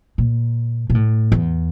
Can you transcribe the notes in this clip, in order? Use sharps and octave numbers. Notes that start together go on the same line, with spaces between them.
A#2
A#2
A2
E2